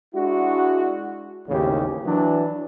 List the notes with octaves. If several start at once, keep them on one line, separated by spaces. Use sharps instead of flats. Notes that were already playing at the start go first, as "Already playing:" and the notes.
G#3 D4 E4 F#4
G#1 D#2 A2 C#3 E3 G4
E3 F#3 D4